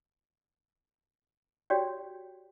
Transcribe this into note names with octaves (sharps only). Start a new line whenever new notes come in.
F#4 G4 C#5 D5 G5